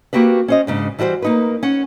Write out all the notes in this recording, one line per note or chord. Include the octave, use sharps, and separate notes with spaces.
A#3 C4 F#4 G4 B4
C#4 C5 D#5
G#2 C#3 D4
E3 G3 F#4 B4 C5
A#3 D#4 B4
C#4 F#5